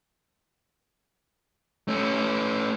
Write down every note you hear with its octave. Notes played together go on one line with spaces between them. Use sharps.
A3 C#4